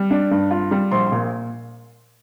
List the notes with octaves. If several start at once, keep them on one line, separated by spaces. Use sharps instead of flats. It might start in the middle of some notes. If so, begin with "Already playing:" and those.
Already playing: G3
D4
G2
F4
G3
A#1 C6
C6
A#2